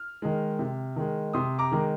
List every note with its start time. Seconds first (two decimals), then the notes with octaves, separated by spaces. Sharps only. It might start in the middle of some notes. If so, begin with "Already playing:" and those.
Already playing: F6
0.22 D#3 G#3
0.59 C3
0.96 D#3 G#3
1.33 C3 C6 D#6
1.59 A#5 D6
1.72 D#3 G#3